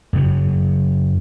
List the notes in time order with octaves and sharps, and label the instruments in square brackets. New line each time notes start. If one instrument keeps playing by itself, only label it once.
[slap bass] F#2 C#3 F#3